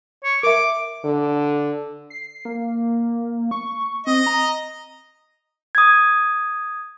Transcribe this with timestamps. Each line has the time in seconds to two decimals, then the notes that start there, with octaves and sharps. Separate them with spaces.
0.24 C#5
0.43 A#4 E5 D6
1.04 D3
2.10 C7
2.45 A#3
3.51 C#6
4.07 C4 D#5
4.26 A#5
5.75 D#6 G#6